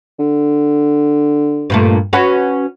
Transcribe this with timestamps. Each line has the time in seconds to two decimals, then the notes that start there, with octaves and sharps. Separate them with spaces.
0.19 D3
1.70 G2 A#2 A3
2.13 C#4 F#4 B4